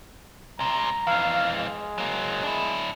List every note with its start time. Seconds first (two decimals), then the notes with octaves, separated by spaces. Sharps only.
0.59 C2 C3 A#5
1.07 F2 E3 F5
1.55 G#3
1.98 F#3 A#3
2.43 D4 E4